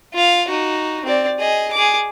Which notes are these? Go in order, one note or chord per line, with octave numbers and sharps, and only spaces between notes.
F4 F5
D#4 F#4
C4 D5
G#4 D#5
G#4 D6